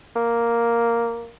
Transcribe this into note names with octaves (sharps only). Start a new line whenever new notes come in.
A#3